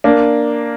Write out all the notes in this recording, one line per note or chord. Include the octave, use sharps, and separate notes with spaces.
A#3 D4